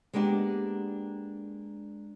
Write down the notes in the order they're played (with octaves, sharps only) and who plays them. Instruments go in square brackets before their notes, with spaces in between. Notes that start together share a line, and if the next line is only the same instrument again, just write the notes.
[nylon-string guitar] G#3 A#3 B3 D4 G4